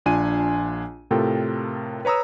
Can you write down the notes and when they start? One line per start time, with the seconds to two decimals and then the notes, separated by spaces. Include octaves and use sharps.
0.06 A#1 D4 F4 G#5 D#7
1.11 A2 C3 F4 A4 A#4 G5
2.05 B4 C#5 A#5 D#6 E6